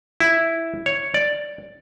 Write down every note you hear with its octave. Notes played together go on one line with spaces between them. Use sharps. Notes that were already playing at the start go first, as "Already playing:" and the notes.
E4
C#5
D5